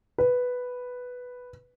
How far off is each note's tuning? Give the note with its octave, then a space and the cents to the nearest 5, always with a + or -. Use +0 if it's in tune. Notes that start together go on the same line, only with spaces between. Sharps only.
B4 +0